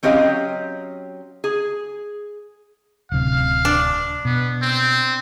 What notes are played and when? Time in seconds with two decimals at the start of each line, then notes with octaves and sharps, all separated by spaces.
0.03 F#3 C4 C#4 G4 D#5 F5
1.44 G#4
3.12 D1 C3 F5
3.65 D4
4.25 B2 B3
4.62 C4